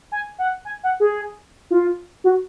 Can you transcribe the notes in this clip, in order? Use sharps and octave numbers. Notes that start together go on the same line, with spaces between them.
G#5
F#5
G#5
F#5
G#4
F4
F#4